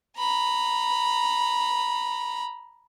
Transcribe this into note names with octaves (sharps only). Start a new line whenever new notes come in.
A#5 B5